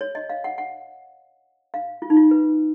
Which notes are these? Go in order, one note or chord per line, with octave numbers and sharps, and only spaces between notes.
C#5
D#5
F5
F#5
F#5
F5
F4
D#4
F4
B4